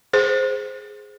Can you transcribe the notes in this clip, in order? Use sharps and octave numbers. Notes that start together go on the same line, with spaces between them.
G#4 C5